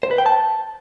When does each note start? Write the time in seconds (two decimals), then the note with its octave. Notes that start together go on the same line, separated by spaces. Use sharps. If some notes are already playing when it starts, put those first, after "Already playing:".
0.03 C5
0.11 B4
0.18 G5
0.26 A5